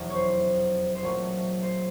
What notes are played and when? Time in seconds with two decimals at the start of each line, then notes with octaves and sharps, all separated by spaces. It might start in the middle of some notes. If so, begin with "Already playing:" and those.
Already playing: F1 E2 B2 F#3
0.10 C5 C#5
0.95 C5
1.03 A#1 A#2 F#3 A3 C#4 C#5
1.63 C5